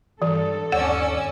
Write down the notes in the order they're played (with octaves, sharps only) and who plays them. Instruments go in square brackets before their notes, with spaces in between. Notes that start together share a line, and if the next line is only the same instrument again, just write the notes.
[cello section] G2 A4 [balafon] E3
[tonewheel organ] D#2 C#5 D5 [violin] C#4 E6 [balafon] F#5